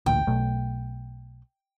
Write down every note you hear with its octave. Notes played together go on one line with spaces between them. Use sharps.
A1 D2 A#2 G5
B1 B2 A3